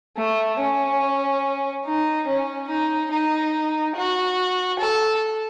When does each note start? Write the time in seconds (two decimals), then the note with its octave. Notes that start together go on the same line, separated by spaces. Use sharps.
0.17 A3
0.59 C#4
1.86 D#4
2.27 C#4
2.69 D#4
3.12 D#4
3.96 F#4
4.80 A4